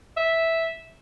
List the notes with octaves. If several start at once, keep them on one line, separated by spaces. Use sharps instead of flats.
E5